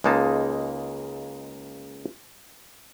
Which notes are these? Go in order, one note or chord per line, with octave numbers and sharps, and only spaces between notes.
C#2 G#3 A#3 D#4 A5